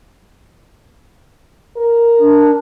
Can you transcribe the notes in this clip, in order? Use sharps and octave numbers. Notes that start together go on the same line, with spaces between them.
A#4
D4